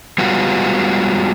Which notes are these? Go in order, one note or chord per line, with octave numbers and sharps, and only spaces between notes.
G3 G#3 B3 F4 F#4